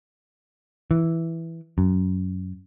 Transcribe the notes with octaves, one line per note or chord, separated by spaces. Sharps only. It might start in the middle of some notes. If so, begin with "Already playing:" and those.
E3
F#2